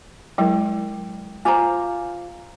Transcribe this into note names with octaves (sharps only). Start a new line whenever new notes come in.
F#3 G#3 E4 A#4 G5
F4 C5 G#5 A#5 D6